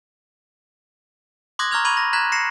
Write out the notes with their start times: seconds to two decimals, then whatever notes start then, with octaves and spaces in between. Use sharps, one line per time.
1.59 C6 D6 D#6 F#6 G#6 A#6
1.71 A#5 C#6 F6 G#6 F7
1.85 B5 C#6 G#6 D#7 F#7
1.97 A#6
2.13 A#5 F#6 G#6 B6 F#7
2.32 A#6 C7 C#7 E7